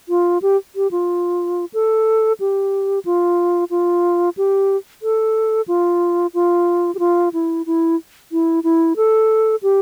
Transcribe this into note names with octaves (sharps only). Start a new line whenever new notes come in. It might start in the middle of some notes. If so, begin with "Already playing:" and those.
F4
G4
G4
F4
A4
G4
F4
F4
G4
A4
F4
F4
G4
F4
E4
E4
E4
E4
A4
G4